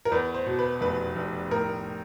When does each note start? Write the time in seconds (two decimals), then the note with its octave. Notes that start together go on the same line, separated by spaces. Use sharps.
0.05 A#4
0.12 E2 B4
0.34 C5
0.46 B2
0.59 B4
0.81 F1 B4
1.16 F1
1.51 A2 A#4